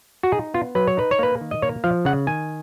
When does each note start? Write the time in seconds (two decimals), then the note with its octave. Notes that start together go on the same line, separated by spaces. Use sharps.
0.23 F#4
0.32 D#4 G#4
0.54 B3 F4
0.75 F#3 B4
0.87 C#5
0.97 D#4 B4
1.11 C#5
1.19 A#3 B4
1.41 D#3
1.51 D#5
1.62 A#3 C#5
1.84 F3 F5
2.05 C#3 F#5
2.27 D#3 G#5